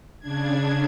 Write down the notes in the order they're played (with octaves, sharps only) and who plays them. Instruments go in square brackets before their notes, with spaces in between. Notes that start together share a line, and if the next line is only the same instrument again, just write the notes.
[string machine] C#3 D4 G#6